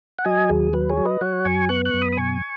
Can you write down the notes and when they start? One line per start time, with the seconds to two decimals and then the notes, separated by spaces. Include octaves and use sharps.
0.19 F#5
0.25 F#3 D#5 G#5
0.49 D#2 G#4
0.73 F#3 B4
0.89 G#4 C#5
0.97 F#3
1.05 B4 D#5
1.21 F#3 C#5 F#5
1.45 F#2 G#5 C#6
1.69 B3 C#6 F#6
1.85 C#6 F#6
1.94 F#2
2.02 B5 D#6
2.12 D#6
2.17 B2 G#5 C#6